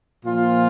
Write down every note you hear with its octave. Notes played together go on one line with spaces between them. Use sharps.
A#2 F3 F4